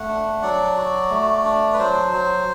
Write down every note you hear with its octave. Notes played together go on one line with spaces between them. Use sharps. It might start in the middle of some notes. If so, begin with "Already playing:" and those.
Already playing: A3 F#5
D4
F#3 D5
F#4
A3
D4
B4
F#3 C5
F#3